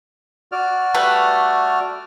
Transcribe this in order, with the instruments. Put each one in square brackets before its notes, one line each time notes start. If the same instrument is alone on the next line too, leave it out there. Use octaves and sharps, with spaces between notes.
[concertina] F#4 D5 F6
[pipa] G3 A3 B4